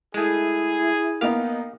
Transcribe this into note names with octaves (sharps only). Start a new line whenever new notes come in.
G#3 A3 E4 G#4
A#3 B3 D#4 G4 F5